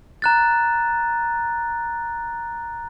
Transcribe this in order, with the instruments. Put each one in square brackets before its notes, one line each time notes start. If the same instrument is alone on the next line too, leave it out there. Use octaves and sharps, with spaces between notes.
[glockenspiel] A#5 F#6 A6